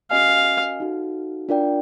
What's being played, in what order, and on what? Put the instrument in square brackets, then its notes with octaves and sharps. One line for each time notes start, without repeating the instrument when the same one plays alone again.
[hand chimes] C#4 F#4 A#4 D#5 G#5 [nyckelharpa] F5
[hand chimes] D#4 F#4 A4
D4 F4 A#4 D5 G5